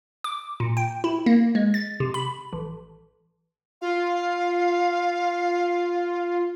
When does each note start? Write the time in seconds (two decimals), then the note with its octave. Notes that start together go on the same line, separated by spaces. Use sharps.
0.24 D6
0.60 A#2
0.77 G5
1.04 E4
1.26 A#3
1.55 G#3
1.74 A6
2.00 C3
2.14 B5
2.53 A1
3.82 F4 F5